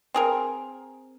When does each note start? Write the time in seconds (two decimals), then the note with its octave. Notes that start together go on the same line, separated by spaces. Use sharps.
0.14 C4 G#4 A#4